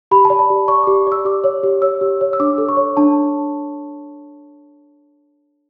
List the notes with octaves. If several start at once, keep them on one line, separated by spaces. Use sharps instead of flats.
G4 B5
A5
D5
B5
G4
D5 C#6
G4 D6
D5 E6
G4 D6
C#5
G4
C#5 E6
G4
C#5
E6
D4 D6
A4
C#6
C#5
D4 A5